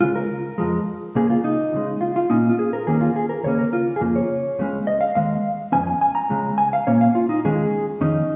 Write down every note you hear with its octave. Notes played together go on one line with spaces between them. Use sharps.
C#2 C#3 G#3 F4
A#4
F2 F3 G#3
C#2 C#3 A#3 G#4
F4
D#4
C#2 C#3 G#3
F4
F4
A#2 A#3 C#4 D#4
F4
G#4
A#4
D#2 D#3 A#3 C#4 G#4
F4
G#4
A#4
D#2 C#3 A#3 C#4 C#5
A#4
F4
G#4
F2 C#3 A#3 F4
C#5
C#2 C#3 G#3 C#4
D#5
F5
D#2 D#3 G#3 F5
F2 D#3 C#4 G#5
G#5
G#5
A#5
C#2 C#3 G#3
G#5
F5
A#2 A#3 C#4 C#5
F5
F4
D#4
D#2 D#3 G#3 C#4 G#4
F2 D#3 C#4 D#4